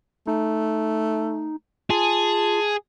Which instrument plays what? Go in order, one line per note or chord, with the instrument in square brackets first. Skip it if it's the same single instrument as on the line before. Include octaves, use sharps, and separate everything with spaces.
[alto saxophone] A3 [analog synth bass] D#4
[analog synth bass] F4 [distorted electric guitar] G#4 [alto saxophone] A5